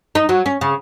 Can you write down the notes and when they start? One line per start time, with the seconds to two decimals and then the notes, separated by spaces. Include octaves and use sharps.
0.15 D#4
0.29 F#3
0.46 C#4
0.61 C#3